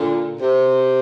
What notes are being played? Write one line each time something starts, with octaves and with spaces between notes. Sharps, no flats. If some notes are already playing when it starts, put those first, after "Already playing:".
Already playing: A#2 D3
C3